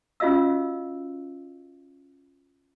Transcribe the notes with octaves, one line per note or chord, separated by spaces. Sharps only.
C#4 F4 F#4 D#5 F5 E6